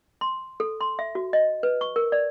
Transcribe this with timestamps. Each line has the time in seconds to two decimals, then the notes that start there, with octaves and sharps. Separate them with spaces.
0.21 C6
0.60 A4
0.81 C6
0.99 E5
1.15 F#4
1.33 D#5
1.63 B4
1.81 C#6
1.96 A#4
2.12 D5